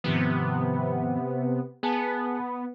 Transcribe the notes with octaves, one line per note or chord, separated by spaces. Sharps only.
G#2 C3 D#3 F3 B3
B3 G#4 G#5 A5